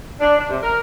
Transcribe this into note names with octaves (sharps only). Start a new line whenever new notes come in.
D4
D4
C3
A#4